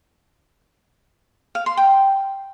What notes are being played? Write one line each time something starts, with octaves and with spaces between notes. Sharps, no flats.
F5
C6
G5